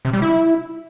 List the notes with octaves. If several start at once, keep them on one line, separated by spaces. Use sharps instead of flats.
C3
G3
E4